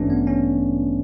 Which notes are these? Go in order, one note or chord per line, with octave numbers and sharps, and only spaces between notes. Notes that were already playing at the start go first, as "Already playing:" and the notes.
Already playing: A1 G2 E3 A3 C#4 D4
B3
C#4